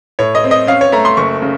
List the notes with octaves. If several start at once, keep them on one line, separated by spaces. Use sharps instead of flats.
A2 C#5
D#5
C4
D#5
C#4 F5
C#5
A3 A#5
C6
F#1 C#6
C#3